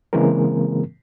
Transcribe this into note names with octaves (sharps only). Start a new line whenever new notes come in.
C#3 E3 G#3 A#3 C4 A#4